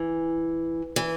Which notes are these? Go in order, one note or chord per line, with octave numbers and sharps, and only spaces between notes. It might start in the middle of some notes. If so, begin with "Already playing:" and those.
Already playing: E3
E3